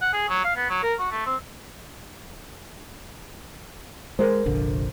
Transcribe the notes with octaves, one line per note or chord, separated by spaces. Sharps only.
F#5
G#4
F#3
F5
B3
F#3
A#4
F#4
A3
C4
G#3 A#4 C5
F1 A#1 D3